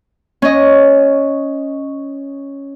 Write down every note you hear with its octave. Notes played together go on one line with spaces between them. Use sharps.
C#4 D#5